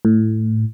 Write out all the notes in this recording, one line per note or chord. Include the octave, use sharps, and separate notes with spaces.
A2